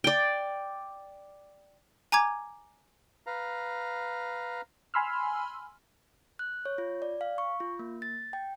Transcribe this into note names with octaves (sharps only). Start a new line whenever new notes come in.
D5 G5
G#5 A#5 D6 G#6
B4 F5 A#5
G#5 B5 C6 E6 F6
F#6
C#5
F4
D5
F5
C#6
F4
A#3
A6
G5